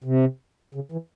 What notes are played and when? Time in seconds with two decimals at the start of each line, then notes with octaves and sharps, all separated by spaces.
0.04 C3
0.75 C#3
0.92 E3